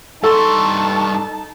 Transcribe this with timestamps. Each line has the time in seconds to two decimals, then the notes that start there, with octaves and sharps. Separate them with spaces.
0.23 G2 D#4 A4 A5 C6 C#6